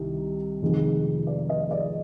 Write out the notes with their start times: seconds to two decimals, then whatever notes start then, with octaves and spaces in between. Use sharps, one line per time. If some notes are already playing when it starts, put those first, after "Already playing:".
Already playing: C2 C3 D#3
0.62 F1 F2 D#3 G#3
1.27 D5
1.49 D#5
1.71 D5